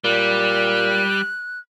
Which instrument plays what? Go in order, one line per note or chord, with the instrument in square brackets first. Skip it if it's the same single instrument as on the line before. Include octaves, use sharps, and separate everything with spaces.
[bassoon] A#2 [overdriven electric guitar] G3 [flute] F#6